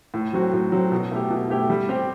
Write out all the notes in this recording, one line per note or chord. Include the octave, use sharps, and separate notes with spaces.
A2
F#3 C4 F#4
A2
F#3 C4 F#4
B2
A3 E4 G4
B2
A3 E4 G4
G3
C4 G4